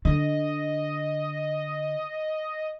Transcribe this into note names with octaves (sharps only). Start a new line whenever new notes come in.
D3 D#5